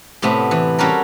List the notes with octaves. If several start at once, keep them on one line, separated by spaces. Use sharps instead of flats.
A2 C3 A3 B3
E3
G3 C#4 F#4 A4 A#4